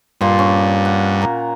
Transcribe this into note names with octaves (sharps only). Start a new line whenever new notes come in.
G2 A#2 D5 C6
C#4
F#5
A#2 A#4